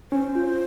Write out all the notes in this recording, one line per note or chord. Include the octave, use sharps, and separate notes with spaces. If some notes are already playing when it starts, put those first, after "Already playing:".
C#4 C5
F4